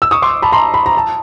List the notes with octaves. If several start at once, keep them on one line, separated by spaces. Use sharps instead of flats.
E6
C#6 D#6
C6 D6
A5 B5
A#5 C6
B5
A#5
A5